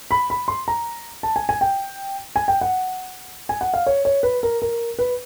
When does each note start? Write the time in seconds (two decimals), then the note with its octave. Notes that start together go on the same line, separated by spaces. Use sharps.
0.11 B5
0.30 B5
0.48 C6
0.68 A#5
1.23 A5
1.36 G#5
1.49 G#5
1.61 G5
2.36 G#5
2.48 G5
2.61 F#5
3.49 G#5
3.61 F#5
3.74 F5
3.87 C#5
4.05 C#5
4.23 B4
4.43 A#4
4.62 A#4
4.99 B4